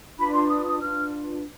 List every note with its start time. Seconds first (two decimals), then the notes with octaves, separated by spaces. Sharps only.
0.18 D4 F4 B4 B5
0.34 C6
0.49 D#6
0.65 D#6
0.80 D4 F4 B4 F6